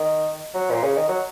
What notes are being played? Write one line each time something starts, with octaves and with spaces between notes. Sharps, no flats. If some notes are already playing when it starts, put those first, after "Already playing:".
Already playing: D#3
F#3
A#2
C#3
D#3
F#3